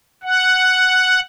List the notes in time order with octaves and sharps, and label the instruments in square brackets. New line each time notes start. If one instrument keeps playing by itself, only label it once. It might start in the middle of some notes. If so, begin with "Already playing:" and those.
[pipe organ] F#5